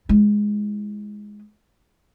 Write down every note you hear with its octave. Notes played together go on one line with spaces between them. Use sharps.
G#3 E4